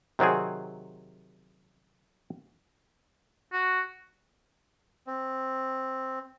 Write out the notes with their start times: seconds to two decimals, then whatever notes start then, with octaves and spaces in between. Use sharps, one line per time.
0.19 C3 D#3 F#3 C4 G#4
3.53 F#4
5.07 C4